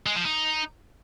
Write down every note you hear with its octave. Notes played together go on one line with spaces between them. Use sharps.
G#3
F3
D#4